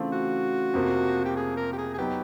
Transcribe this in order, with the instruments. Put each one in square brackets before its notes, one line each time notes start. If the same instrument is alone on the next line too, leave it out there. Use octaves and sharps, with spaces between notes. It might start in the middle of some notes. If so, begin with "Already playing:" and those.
Already playing: [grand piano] C#3 E3 A3 C4 F4
[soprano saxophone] F#4
[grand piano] F2 C3 F3 A#3
[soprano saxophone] G4
G#4
A#4
G4
G#4
G#4
[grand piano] F#3 B3 D#4 [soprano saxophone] G4